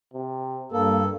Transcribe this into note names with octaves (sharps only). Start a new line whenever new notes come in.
C3
G2 A#3 A4